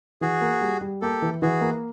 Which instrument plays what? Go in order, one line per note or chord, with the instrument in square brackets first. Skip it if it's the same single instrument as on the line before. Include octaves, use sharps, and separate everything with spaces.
[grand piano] E3 [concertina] F#4 G#4
[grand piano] A#3
G3
G3
[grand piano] A#3 [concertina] G4 A4
[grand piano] E3
[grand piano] E3 [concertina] F#4 G#4
[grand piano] A#3